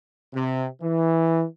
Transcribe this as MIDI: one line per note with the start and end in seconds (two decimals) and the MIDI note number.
0.34 0.66 48
0.82 1.43 52